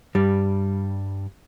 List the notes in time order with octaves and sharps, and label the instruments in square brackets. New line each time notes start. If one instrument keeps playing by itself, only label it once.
[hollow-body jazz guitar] G2 G3